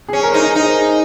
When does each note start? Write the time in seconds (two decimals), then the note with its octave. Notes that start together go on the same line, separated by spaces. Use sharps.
0.09 G#4
0.13 C#4
0.23 A#4
0.31 C5
0.34 D#4
0.40 A#4
0.54 D#4 G#4